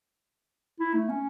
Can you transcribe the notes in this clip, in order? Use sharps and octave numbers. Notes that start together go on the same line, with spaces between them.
E4
A3
C#4